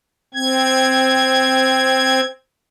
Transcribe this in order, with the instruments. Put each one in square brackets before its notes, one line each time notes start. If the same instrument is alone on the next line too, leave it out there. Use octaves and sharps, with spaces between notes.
[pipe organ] C4 G#6